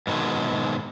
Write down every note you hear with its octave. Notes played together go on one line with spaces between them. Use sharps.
G#2 B2 D#3 F#3 G#3